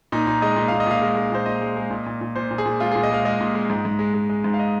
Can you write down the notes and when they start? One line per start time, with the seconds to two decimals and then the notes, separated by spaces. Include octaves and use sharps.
0.12 A#2 D#4
0.27 A#2 D#4
0.42 G#3 D#5
0.56 A#2
0.68 A#2 F5
0.80 D#5
0.87 A#2 F5
1.02 G#3
1.16 G#3
1.32 A#2 C5
1.46 A#2 D#5
1.61 G#3
1.77 G#3
1.91 A#2
2.06 A#2
2.21 A#2
2.35 A#2 C5
2.51 A#2
2.58 G#4
2.66 A#2
2.80 G#3 F4
2.92 A#2 G#4
3.03 D#5
3.11 G#3 F5
3.25 G#3 D#5
3.41 A#2
3.55 G#3
3.70 G#2
3.85 G#2
3.99 G#3
4.14 G#3
4.29 G#3
4.44 G#2
4.54 F5
4.59 D#5